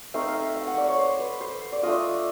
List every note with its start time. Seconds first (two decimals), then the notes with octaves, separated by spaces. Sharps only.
0.14 A3 C4 D#4 F5
0.28 F5
0.42 E5
0.56 F5
0.67 F#5
0.77 D5
0.88 C#5
0.98 C5
1.19 B4
1.41 C5
1.72 D5
1.83 A3 D4 F4 D#5